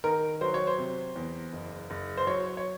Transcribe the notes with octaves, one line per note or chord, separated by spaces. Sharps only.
D#3 A#4
F#3 C5
C#5
C5
C3
E2
F#1
F#1
C5
F#3 C#5
C#5